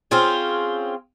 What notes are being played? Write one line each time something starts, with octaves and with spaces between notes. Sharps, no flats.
C4 C#4 F4 G#4